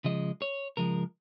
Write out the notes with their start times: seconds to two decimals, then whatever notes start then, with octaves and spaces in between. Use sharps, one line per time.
0.04 C#3 F3 G#3 D#5
0.42 C#5
0.77 C#3 F3 G#3 A#4